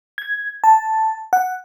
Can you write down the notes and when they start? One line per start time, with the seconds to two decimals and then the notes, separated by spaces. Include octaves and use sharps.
0.18 G#6
0.64 A5
1.33 F#5